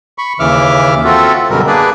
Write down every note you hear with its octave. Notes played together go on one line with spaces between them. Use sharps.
B5 C#6
D#2 C#3 E3 E5 D6 F6
C4 F4 F#4 A4 E5
F#2 B2 D3 G3 A#4
A#3 D4 G#4 B4 D5